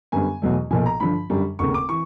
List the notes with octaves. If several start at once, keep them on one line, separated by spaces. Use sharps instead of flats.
F#2 D3 G3 B3 G#5
E2 B2 F#3 A3
B1 A#2 F3 G#5
A#5
G2 D3 F3 B5
F#2 D3 G3
F1 D#2 C#3 C#6
D6
E3 C#6